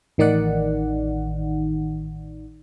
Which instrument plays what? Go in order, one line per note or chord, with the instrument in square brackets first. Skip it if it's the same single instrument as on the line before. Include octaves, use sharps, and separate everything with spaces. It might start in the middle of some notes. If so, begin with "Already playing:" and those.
[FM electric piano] A1 D#3 D#4 D5 F#5